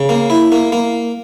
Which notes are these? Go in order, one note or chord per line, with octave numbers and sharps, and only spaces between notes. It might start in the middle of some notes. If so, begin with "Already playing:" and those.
Already playing: C#3
A#3
E4
A#3
A#3